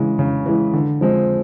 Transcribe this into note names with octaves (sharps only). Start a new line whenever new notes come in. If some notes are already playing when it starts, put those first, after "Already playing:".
Already playing: C#3 E3 G#3
C#3
E3 G#3
D3
F3 G#3 C4